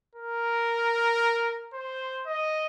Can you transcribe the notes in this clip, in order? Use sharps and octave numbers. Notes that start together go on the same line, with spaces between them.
A#4
C5
D#5